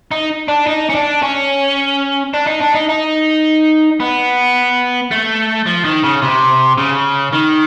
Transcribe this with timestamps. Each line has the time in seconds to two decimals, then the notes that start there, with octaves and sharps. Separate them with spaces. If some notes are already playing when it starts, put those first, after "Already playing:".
0.11 D#4
0.48 D4
0.67 D#4
0.90 C#4
0.95 D4
1.23 C#4
2.34 D4
2.47 D#4
2.61 D4
2.75 D#4
2.89 D#4
4.00 B3
5.11 A3
5.66 F3
5.85 D#3
6.03 C#3
6.22 C3
6.78 C#3
7.33 D#3